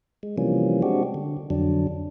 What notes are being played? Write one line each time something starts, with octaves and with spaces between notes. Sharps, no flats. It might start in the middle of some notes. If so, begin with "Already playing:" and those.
G#3
C3 E3 F3 G3 A#3 C#4
G#3 C4 D4 F#4 G4
D3
F2 D3 F#3 D4